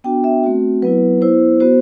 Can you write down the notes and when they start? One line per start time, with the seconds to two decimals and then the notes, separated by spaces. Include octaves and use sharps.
0.04 B3 D4 F#4 G5
0.24 E5
0.44 A3 C4 F#4
0.82 F#3 B3 E4 B4
1.21 B3 E4 C5
1.60 B3 F#4 C5